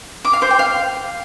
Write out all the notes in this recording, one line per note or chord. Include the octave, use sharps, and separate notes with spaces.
D6
F5
C5
G5
F5